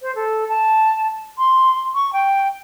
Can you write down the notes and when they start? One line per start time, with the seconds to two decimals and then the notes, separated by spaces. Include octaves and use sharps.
0.01 C5
0.15 A4
0.49 A5
1.38 C6
1.95 C#6
2.13 G5